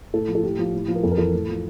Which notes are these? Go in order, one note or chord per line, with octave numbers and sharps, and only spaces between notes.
A2 A4
F3
A4
A2 G4
F3
A2
F3
A#4
F2 A4
A#4
E3 A4
A2
F3